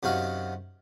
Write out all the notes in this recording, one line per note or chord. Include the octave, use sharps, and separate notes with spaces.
F#2 C3 D#3 F#4 F5